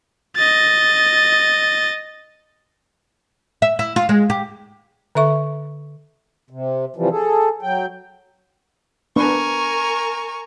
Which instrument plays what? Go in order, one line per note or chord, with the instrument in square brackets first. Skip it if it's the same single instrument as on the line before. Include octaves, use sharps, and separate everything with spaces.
[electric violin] D#5 A6
[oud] E5
E4
F4
G#3
G4
[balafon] D3 A4 E5 C#6
[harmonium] C3
C3 E3 F3 G3
G#4 A4
F#3 G5
[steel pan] B3 D4 B4 [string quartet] A#4 G#5 A#5 [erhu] C#6